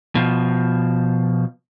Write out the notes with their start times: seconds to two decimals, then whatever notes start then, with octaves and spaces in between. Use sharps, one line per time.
0.15 B2 F3